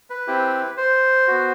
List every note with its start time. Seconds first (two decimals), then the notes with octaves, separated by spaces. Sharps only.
0.10 B4
0.27 C4 E4 G4
0.77 C5
1.28 B3 F#4